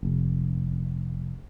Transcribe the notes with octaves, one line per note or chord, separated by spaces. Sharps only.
F1